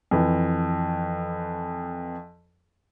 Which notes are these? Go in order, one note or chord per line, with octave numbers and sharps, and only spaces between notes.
F2 E3